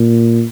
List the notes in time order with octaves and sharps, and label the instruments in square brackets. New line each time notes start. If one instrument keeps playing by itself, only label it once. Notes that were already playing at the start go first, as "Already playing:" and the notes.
Already playing: [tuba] A#2